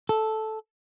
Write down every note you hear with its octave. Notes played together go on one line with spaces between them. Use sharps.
A4